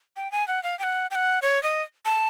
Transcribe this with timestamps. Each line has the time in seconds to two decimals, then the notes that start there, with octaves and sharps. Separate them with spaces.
0.16 G5
0.32 G#5
0.48 F#5
0.63 F5
0.79 G5
0.83 F#5
1.11 G5
1.15 F#5
1.42 C#5
1.63 D#5
2.05 A5